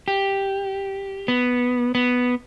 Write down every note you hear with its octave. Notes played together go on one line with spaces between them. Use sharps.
G4
B3
B3